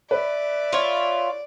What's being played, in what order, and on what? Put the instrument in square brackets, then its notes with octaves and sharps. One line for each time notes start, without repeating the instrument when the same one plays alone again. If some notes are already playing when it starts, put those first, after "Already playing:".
[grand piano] B4 [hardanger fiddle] D5 [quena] E5
[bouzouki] F4 C#5